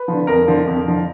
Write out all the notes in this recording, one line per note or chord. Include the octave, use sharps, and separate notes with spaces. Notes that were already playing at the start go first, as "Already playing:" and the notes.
Already playing: B4
D3 F3
F2 A#4
D3 F3
F2
D3 F3